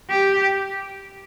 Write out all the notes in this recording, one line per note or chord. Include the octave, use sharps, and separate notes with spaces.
G4